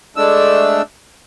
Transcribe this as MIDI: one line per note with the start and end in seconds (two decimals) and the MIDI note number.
0.17 0.82 56
0.17 0.82 57
0.17 0.82 62
0.17 0.82 88